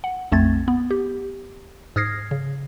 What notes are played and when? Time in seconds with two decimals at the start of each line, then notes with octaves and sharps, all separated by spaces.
0.04 F#5
0.32 A#1 F2 A3 C4 G#6 A6
0.68 B3
0.91 G4
1.96 G#2 D#6 F6 G#6 A#6 C7
2.31 C#3